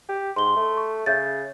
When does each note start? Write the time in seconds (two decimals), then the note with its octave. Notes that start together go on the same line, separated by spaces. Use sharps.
0.09 G4
0.36 G#2 C6 G7
0.56 A3
0.77 C#6
1.06 C#3 E5 G6 A6